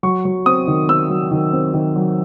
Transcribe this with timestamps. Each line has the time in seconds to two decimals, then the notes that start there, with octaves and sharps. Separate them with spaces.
0.03 F#3 C#6
0.25 F#3
0.46 C4 D#6
0.67 D#3
0.89 C4 E6
1.10 F#3
1.31 D#3
1.53 C4
1.74 D#3
1.96 F#3